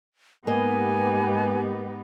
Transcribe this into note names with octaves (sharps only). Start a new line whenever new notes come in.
G#2 A#3 B3 D#4 G4 B4 D#5 G#5